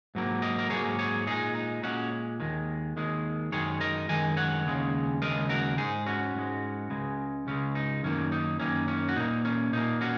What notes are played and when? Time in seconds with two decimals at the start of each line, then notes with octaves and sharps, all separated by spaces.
0.15 G#2 F#3 A#3
0.42 A#4 D#5
0.59 A#4
0.70 G#2 F#3 A#3 G#4 C#5
0.99 G#4 C#5
1.27 A#2 G#3 D#4 G#4
1.55 D#4
1.83 A#2 G#3 C#4 F#4
2.40 D#2 D#3 G#3
2.96 D#2 D#3 G#3
3.52 F#2 D#3 G#3 G#4 C#5
3.80 A#4 D#5
4.09 F#2 D#3 G#3 D#5 G#5
4.37 C#5 F#5
4.66 D#2 C#3 G#3
5.22 D#2 C#3 G#3 A#4 D#5
5.49 F#4 A#4
5.77 G#2 G#3 D#4 G#4
6.06 C#4 F#4
6.35 G#2 G#3
6.90 C#2 C#3 G#3
7.47 C#2 C#3 G#3 C#4
7.75 D#4
8.03 F#2 D#3 A#3 C#4
8.32 D#4
8.60 F#2 D#3 A#3 C#4
8.88 C#4
9.08 F#4
9.16 A#2 A#3 D#4
9.45 C#4
9.73 A#2 A#3 D#4
10.01 C#4 F#4